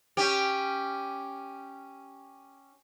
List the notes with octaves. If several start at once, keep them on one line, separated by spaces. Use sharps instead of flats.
C#4 G4